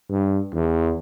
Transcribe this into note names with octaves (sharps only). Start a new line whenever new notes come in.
G2
E2